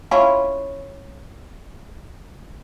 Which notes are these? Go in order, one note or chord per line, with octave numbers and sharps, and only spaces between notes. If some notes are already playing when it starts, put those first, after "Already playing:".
C#4 E4 F4